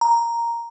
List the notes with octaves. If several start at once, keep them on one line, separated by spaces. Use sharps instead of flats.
A#5